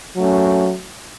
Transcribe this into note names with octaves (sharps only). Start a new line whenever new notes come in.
F#3 A3 C#4